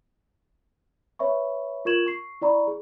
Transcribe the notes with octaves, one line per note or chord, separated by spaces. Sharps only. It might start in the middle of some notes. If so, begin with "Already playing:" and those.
B4 C#5 E5 B5 C#6
F4 A#4 C#6 G#6 E7 F#7
C#6 C7
E4 D5 A#5 B5 C#6
G#4